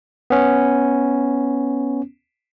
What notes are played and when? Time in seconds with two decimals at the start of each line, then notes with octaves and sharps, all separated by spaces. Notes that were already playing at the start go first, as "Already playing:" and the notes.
0.30 B3 C#4